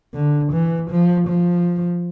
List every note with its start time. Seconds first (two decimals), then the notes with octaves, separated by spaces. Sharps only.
0.14 D3
0.52 E3
0.90 F3
1.28 F3